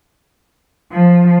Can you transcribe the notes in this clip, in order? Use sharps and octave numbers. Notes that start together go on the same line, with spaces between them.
F3